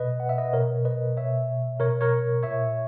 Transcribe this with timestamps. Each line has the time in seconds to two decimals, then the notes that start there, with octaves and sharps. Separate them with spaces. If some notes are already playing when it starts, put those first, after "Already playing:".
Already playing: B2 B4 D#5
0.20 F#5
0.29 E5
0.38 B4 D#5
0.53 B2 A#4 C#5
0.85 B4 D#5
1.17 B2 C#5 E5
1.80 B2 A#4 C#5
2.01 A#4 C#5
2.43 A#2 C#5 E5